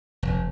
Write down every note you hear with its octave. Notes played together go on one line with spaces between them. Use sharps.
F1